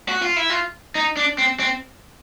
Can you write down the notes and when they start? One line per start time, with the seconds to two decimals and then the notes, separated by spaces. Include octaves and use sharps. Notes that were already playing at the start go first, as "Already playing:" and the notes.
0.09 F#4
0.22 F4
0.36 E4
0.50 F4
0.95 D#4
1.17 D4
1.38 C4
1.60 C4